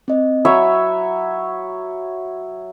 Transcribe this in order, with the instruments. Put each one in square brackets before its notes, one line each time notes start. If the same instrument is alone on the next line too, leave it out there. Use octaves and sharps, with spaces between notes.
[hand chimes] C4 D#5
[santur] F#3 C#5 E5 [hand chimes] B5